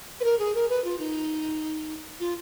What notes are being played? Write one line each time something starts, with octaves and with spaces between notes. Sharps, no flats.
B4
A#4
G#4
A#4
B4
F4
D#4
F4